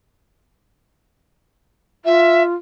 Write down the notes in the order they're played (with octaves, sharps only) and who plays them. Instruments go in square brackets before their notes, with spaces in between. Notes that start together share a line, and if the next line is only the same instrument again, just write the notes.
[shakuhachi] F4 [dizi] E5